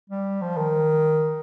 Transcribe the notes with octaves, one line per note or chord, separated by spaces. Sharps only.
G3
F3
D#3